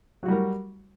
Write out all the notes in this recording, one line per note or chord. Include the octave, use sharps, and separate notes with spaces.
F#3 G3 F#4 A#4